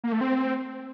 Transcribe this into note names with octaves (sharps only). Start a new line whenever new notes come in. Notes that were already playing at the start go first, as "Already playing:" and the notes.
A#3
A3
C4